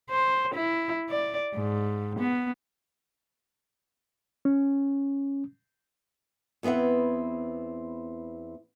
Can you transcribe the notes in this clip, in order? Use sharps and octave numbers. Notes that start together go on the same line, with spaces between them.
C5
E4
D5
G#2
B3
C#4
E2 B3 C4 E4 F#5